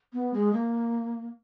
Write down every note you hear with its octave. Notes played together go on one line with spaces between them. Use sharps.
B3
G#3
A#3